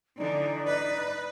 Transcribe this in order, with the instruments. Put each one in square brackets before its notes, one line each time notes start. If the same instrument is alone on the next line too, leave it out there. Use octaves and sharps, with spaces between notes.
[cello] D3 E3 [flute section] D#4 D5
[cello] B4